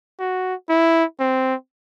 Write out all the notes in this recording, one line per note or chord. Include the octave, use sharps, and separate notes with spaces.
F#4
E4
C4